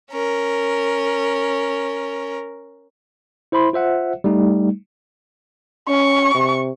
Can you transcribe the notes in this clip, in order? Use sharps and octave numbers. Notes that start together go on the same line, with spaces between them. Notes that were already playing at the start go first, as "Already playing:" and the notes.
C#4 A#4
E4 C5 E5 B5 C6
F4 C5 E5 F#5
G3 A3 D#4
C#4 C#6
C3